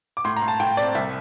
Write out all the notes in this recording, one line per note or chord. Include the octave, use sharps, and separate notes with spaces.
D6
A2 C6
A#5
A2
A5
A2 G5
C4 D5
C2 E5